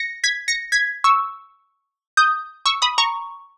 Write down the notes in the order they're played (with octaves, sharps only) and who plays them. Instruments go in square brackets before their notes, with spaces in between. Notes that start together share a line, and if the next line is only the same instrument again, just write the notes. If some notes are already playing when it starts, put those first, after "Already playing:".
Already playing: [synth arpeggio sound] A#6 C#7
G#6 B6
A#6 C#7
G#6 B6
C#6 E6
D#6 G6
C#6 E6
B5 D#6
A#5 C#6